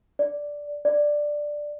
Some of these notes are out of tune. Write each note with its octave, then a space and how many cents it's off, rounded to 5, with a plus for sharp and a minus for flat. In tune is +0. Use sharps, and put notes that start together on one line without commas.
D5 -5
D5 +5